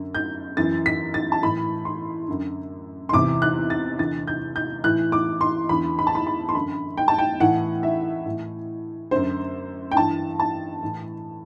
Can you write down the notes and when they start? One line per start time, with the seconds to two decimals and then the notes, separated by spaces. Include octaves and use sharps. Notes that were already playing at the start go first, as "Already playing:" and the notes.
Already playing: F#2 D3
0.15 G6
0.57 F#2 E3 A6
0.86 B6
1.14 A6
1.32 A5
1.42 A2 E3 B5
1.85 C6
2.28 F#2 D3
3.09 C6
3.13 E2 C3 E3 D6
3.42 F#6
3.70 A6
3.99 E2 D3 A6
4.27 G6
4.56 G6
4.84 A2 E3 F#6
5.12 D6
5.41 C6
5.69 E2 D3 B5
5.99 B5
6.07 A5
6.15 B5
6.27 B5
6.49 C6
6.55 F#2 D3 B5
6.97 G5
7.08 A5
7.18 G5
7.40 A2 E3 F#5
7.83 E5
8.25 A2 E3
9.11 F#2 D3 C5
9.91 G5
9.96 G2 E3 A5
10.40 A5
10.82 A2 E3